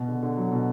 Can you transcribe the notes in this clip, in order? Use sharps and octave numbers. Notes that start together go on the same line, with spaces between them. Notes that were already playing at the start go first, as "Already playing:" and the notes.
Already playing: B2
D3
D3
F#3
B2